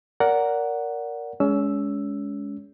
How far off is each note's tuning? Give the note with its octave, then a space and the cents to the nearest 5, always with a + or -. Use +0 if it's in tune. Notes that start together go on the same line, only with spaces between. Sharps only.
A#4 +0 D5 -25 F#5 +0
G#3 +0 C#4 +30 E6 +0